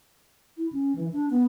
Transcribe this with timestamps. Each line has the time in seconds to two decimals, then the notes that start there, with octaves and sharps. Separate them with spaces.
0.57 E4
0.72 C#4
0.95 E3
1.12 D4
1.30 B3